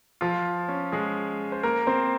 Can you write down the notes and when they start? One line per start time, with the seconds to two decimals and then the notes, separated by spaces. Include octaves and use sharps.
0.21 F3 F4
0.68 C#4
0.92 G#3 G#4
1.52 C5
1.63 A#3 A#4
1.87 C4 C5